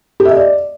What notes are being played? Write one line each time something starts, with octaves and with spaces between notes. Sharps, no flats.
G4
E5
D#5
D5